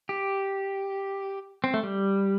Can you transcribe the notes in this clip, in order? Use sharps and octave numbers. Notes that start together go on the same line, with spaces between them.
G4
C4
A3
G3